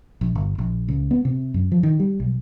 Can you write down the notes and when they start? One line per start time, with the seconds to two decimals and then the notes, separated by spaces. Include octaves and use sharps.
0.21 A#1
0.35 G1
0.58 A#1
0.88 C#2
1.11 B3
1.25 C3
1.54 F#2
1.72 F3
1.83 D#3
2.00 G3
2.20 B1